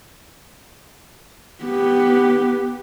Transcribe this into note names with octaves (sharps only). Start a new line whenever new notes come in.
B3 G4